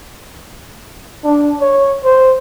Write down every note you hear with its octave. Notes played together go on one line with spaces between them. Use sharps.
D4
C#5
C5